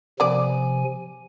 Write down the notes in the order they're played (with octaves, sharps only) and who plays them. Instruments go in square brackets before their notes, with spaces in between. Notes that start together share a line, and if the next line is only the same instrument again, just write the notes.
[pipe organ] C3 F3 G#5 [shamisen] B3 D5